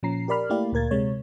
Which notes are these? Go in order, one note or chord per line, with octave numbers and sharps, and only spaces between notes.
A#2 F3 C#4 A#5 C7
G4 A#4 D5 B5 F6
A3 A#3 E4 G4 D5 F5
D2 A#2 A#4 G#6 A6
C3 G#3 C#5